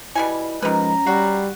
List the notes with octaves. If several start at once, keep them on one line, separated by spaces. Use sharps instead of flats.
B2 G3 E4 G#5
D#3 F3 G#3 C#4 B4 A#5
G3 F#4 F#5 C7